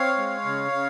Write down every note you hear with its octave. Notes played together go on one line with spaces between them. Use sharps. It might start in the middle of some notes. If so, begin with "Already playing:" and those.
Already playing: C4 C#5 F5
G#3
C#3
C#3